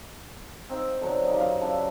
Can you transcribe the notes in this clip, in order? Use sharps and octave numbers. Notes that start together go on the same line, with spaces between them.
C4 D#4 G5
D3 F#3 C4 D#4
D#4 F4 G4
F#2 F5
C#3 D4 E4